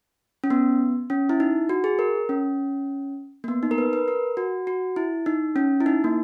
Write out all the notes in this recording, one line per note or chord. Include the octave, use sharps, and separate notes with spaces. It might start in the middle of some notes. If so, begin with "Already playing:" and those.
C#4
B3
C#4
E4
D#4
F#4
G#4
A#4
C#4
A#3
B3
D#4
A#4
B4
B4
A#4
F#4
F#4
E4
D#4
C#4
E4
D#4
A#3